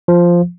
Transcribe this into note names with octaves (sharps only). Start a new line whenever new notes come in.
F3